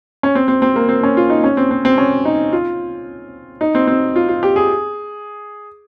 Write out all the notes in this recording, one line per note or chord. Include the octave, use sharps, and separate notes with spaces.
C#4
C4
C4
C4
A#3
C4
C#4
F4
D#4
C#4
C4
C4
C4
C#4
D#4
F4
D#4
C4
C4
F4
F4
G4
G#4